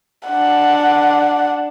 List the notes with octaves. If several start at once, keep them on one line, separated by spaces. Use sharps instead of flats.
D4 F#5